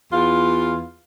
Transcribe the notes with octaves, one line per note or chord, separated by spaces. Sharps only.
E2 F4